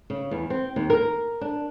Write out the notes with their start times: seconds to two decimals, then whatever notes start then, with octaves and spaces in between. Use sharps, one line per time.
0.10 C#3
0.31 E2
0.50 C4
0.76 D#2
0.90 A#4
1.41 D4